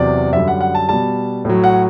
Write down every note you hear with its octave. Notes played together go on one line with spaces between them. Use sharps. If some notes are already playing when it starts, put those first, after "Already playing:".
Already playing: E2 C3 F#3 D5
F#2 D3 G3 E5
F#5
F#5
A5
B2 G3 A5
A2 F#3
F#5